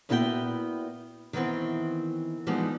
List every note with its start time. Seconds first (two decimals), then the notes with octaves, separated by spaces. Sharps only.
0.09 A#2 B3 E4 F#4 A#4 G5
1.33 D#3 E3 B3 C4 E4
2.47 E3 F3 G3 G#3 B3 D#4